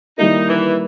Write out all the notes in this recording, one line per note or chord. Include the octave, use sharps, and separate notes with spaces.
D#3 G3 A#3 D#4 E4 A#4
E3